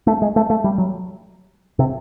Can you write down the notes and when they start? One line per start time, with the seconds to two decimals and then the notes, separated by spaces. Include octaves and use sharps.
0.07 A3
0.22 G#3
0.36 A3
0.50 A3
0.64 G3
0.78 F#3
1.79 C3